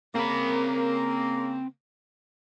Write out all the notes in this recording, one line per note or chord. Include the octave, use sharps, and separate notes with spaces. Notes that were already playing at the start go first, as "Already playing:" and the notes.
C#3 A#3 C4 B5